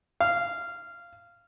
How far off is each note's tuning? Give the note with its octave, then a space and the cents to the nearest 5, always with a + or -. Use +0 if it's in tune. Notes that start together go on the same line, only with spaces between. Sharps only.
F5 -15